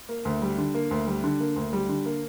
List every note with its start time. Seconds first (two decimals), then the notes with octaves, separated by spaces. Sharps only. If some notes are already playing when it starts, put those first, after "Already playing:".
0.09 A#3
0.25 D2
0.42 G3
0.58 D3
0.74 A#3
0.91 D2
1.07 G3
1.24 D3
1.40 A#3
1.56 D2
1.73 G3
1.89 D3
2.05 A#3